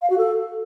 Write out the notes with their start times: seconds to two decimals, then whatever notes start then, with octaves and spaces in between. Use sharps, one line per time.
0.02 F5
0.10 F#4
0.18 A4